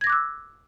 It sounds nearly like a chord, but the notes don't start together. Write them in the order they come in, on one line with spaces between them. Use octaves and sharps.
G#6 A#6 D6 F#6 E6